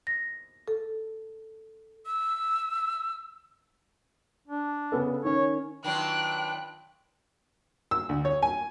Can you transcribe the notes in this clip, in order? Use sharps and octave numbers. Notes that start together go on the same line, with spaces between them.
A#6
A4
E6
D4
C#3 B3 A4
D#3 C#4 C#5
D#3 F#3 D4 F4 B4 G5 F#6
E6
D2
C#5
G#5